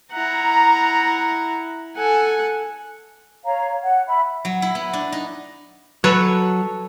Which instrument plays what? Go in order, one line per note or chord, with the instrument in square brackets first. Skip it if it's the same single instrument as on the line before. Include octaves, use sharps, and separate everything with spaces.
[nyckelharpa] E4 F#5 [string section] A#5
[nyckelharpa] A4 F#5 [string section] G#5
[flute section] C#5 F5 A#5
F#5
E5 B5
[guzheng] F#3
E4
B3
D4
D#4
[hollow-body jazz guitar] F#3 [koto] A4 B4 C#5